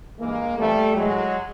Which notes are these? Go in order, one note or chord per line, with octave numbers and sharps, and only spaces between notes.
G2 E3 G#3 A#3
F2 C3 E3 G3 A3
A2 E3 F#3 G#3